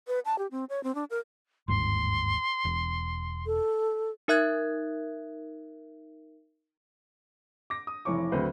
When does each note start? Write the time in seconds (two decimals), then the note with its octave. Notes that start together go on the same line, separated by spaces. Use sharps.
0.07 B4
0.25 A5
0.38 G4
0.51 C4
0.69 C#5
0.83 C4
0.95 D4
1.10 A#4
1.68 G1 D#2 G#2 C6
2.65 E1
3.46 A4
4.28 D#4 A#4 E5 F#6 G#6
7.70 D6 A#6
7.87 D#6
8.05 F1 E3 C#5 C#6 D6
8.32 D2 F#3 C4 B4 C5